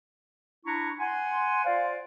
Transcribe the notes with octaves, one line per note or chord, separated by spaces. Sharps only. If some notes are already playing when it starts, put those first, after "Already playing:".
D4 E4 A#5 C#6
F#5 G#5 C6
F4 C5 D5 F5